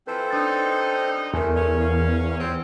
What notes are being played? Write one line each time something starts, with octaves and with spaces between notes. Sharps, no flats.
E3 F3 C4 A4 B4 C5
F#2 G3 D4 D#4 A6
E2 C3 A3 A#4 G#5
C#4
F5
F3 F#3 B3 C4 G#6